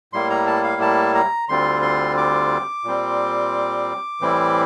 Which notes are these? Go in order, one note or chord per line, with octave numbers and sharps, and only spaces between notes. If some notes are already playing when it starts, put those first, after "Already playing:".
A2 G3 A#3 E4 C6
A#5
A5
F5
A5
A#5
D2 D3 G3 C4 F4 C6
C6
D6
A#2 G3 C4
A2 E3 G3 C4 E4